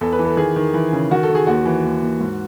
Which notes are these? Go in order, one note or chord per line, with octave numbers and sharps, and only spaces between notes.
E2 A4
B4
E3
A4
D#3 G#4
D#3
E3
C#3
D#3 F#4
A4
D#3
G#4
D#2 F#4
E3
D#2
D#2
G#2